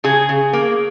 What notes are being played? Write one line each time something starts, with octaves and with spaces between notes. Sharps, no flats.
C#3 G#4
C#3
A#3